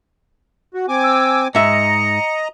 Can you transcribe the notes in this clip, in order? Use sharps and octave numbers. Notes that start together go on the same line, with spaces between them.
F#4
C4 G#5 D6
E6
G#2 D#5 E5 A#5 C#7